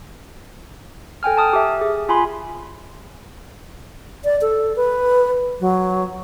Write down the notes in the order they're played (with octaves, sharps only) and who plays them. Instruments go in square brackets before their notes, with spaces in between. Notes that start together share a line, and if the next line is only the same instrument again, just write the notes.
[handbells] A4 G5 G#5 F6
A5 D#6 F6
G4 E5
G#4
F4 G#5 B5 C6
[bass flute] D5
A4
B4
F#3